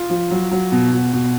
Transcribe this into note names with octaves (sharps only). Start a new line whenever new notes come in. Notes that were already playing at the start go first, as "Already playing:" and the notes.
Already playing: F4
F3
F#3
F#3
B2
B2
B2